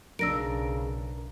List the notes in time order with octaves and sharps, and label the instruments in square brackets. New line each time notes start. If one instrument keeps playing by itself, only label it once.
[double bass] B1 [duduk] C#3 [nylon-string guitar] D4 A#4 [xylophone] E6 A#6 D7